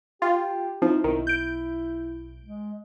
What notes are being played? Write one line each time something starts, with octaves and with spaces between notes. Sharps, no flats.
F4 G4
F3 C4 D#4 E4
B1 D#3
G6 D7
G#3